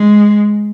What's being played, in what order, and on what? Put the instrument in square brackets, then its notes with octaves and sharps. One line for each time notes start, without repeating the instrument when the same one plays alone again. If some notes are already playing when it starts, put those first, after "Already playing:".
Already playing: [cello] G#3